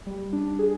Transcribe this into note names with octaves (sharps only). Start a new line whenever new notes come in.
G3
D4
G#4